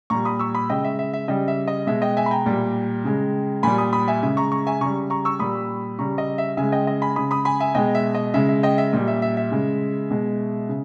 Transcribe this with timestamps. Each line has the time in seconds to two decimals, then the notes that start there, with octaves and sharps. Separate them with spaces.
0.10 A#2 G3 A#5 C#6
0.25 B5 D#6
0.39 C#6 E6
0.55 B5 D#6
0.70 C#3 G#3 D#5 G5
0.84 E5
0.99 E5
1.13 E5
1.28 C#3 G3 D#5 G5
1.48 E5
1.68 D#5
1.87 B2 G#3 E5
2.02 D#5 G5
2.17 E5 G#5
2.26 B5
2.31 G5 A#5
2.46 A#2 G3
3.05 C#3 G#3
3.63 A#2 G3 G#5 B5
3.78 B5 D#6
3.93 B5 D#6
4.08 E5 G#5
4.23 C#3 G#3 E5
4.37 A#5 C#6
4.52 A#5 C#6
4.67 E5 G#5
4.81 C#3 G3 A#5 C#6
5.10 A#5 C#6
5.25 C#6 E6
5.39 A#2 G3 B5 D#6
5.99 C#3 G3 A#5 C#6
6.18 D#5
6.38 E5
6.57 C#3 G#3 E5 G#5
6.72 D#5 G5
6.87 D#5
7.02 G#5 B5
7.16 C#3 G#3 B5 D#6
7.31 B5 D#6
7.45 G#5 B5
7.60 E5 G#5
7.75 B2 G#3 D#5 G5
7.95 E5
8.15 D#5
8.34 C#3 G#3 E5
8.49 E5
8.63 D#5 G5
8.78 E5
8.93 A#2 G3 D#5
9.07 E5
9.22 E5
9.37 E5
9.51 C#3 G#3
10.11 B2 G#3
10.69 C#3